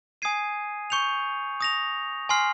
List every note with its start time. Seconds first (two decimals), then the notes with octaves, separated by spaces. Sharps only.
0.22 G#5 D#6 G#6 C7 D#7
0.90 C#6 G6 C#7 F7
1.60 D#6 A#6 F7
2.29 G#5 C6 F6 C7